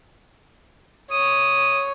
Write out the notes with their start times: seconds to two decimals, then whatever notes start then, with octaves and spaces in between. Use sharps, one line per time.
1.11 C#5 D#6